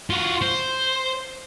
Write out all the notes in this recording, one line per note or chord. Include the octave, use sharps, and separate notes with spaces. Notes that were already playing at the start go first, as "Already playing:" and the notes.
F4 F#4
C5